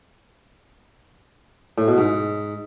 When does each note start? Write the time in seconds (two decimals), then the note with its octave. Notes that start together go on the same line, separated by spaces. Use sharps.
1.78 A2
1.88 B2
1.98 G#2